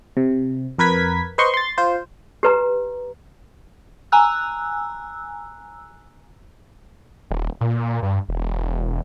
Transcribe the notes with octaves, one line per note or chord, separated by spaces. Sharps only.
C3
F2 A#4 B4 G#6 B6
B4 C5 D#5 C6 C#6
C6 A6
F4 C5
G4 B4 A#5
G#5 A#5 E6 F#6
D#1
A#2
G2
E1